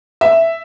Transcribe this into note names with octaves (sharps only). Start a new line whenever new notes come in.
E5